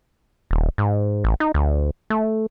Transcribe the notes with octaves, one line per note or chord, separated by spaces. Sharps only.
D#1
G#2
A1
D#4
D2
A3